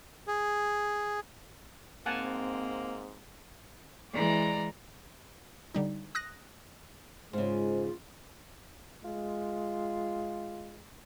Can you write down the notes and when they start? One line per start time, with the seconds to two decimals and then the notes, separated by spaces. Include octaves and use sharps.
0.28 G#4
2.06 G#2 A#3 C4 F#5 G#5 A5
4.13 E3 G#3 D5 A#5
5.74 D3 G3 D#4
6.15 D#6 F#6 A#6
7.33 G#2 C#3 G#3 F4 C5
9.04 G#3 F4